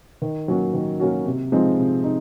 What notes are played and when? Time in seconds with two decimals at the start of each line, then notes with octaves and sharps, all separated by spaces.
0.22 D#3
0.48 F#3 A#3 C#4 F#4
0.74 D#3
1.00 F#3 A#3 C#4 F#4
1.26 C3
1.52 F3 G#3 C4 D#4
1.79 C3
2.04 D#4